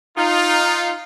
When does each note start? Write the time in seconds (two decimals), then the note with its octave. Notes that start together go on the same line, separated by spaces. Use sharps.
0.17 D#4 F4